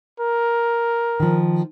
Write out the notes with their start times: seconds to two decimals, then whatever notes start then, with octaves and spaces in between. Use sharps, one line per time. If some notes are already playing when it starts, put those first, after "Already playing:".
0.20 A#4
1.20 D#3 F3